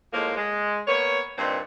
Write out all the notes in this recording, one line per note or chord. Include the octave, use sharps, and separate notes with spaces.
A2 F3 G#3 A#3
G#3
A#3 B3 C#5
G2 A#2 D#3 C4